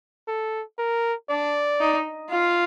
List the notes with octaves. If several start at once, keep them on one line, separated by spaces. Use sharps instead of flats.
A4
A#4
D4 D5
D#4
F4 F5